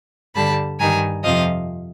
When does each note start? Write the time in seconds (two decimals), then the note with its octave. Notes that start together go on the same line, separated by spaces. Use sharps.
0.35 G2 D3 G3 A5 B5
0.80 G2 D#3 G3 G#5 A#5
1.24 F2 C3 F3 D#5 F5